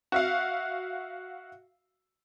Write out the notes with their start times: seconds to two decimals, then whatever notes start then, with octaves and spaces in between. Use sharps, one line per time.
0.12 F#4 E5 F5